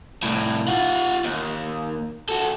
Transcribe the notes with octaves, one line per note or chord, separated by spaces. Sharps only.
C2 A2
F4 F#5
D#2
F#4 A4